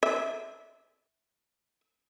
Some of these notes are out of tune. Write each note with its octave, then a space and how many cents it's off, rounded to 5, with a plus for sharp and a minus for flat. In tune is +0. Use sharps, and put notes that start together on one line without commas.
E5 -10